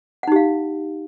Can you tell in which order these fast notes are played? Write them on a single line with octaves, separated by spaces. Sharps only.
F#5 D#4 G4 F5